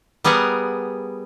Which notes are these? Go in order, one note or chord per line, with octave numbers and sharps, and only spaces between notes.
G3 B3 G#4 A#4 F#5